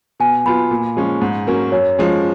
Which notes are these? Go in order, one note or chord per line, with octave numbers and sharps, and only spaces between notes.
B2 G#5
F#3 B3 F4 B5
A#2
F3 G#3 C#4
G#2
F#3 A#3 C#4
F#2 C#5
F3 G#3 C#4